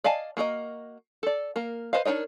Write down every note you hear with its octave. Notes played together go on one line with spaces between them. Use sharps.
D5 D#5 F5 G#5 A5
A#3 F#4 A#4 D#5
A4 D5
A#3 A#4
B4 C5 D#5 F5
D4 D#4 A#4 C#5 D#5